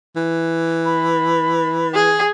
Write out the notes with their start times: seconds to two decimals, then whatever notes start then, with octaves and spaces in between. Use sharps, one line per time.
0.16 E3
0.85 B5
1.94 G#4